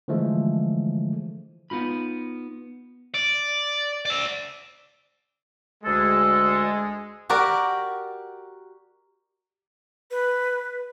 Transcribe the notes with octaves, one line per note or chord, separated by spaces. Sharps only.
D3 E3 F3 G#3 A3
B3 D#4 F4 B5
D5
D5 E5
D2 G#3 A4
F#4 G4 A#4 D5
B4